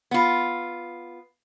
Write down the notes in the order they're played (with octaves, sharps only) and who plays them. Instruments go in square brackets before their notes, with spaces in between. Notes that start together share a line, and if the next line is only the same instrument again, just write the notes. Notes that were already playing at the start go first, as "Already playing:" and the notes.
[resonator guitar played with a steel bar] B3 F4